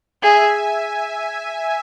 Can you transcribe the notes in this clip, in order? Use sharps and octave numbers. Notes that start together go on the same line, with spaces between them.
G#4 E5 G#5